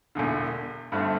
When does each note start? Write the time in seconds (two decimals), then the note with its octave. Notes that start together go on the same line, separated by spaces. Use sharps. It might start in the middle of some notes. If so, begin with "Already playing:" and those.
0.15 E1 E2 D3
0.92 G1 G2 D3 A3 C4